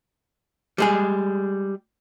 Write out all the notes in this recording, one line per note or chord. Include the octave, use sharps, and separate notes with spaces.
G3 G#3 G#4